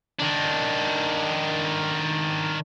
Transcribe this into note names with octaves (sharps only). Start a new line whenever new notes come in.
D#3 D4